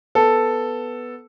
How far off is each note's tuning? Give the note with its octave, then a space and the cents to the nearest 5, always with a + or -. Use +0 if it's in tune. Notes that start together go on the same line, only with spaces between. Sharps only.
B3 +0 A4 +0